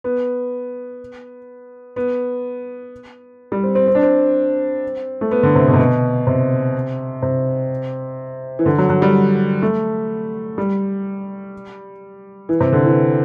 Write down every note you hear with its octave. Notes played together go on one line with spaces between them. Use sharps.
B3
B3
G3
C4
C4
C4
D4
C4
A3
B3
D3
C3
B2
C3
B2
C3
C3
E3
D3
F#3
F#3
G3
A3
G3
E3
C3
D3
E3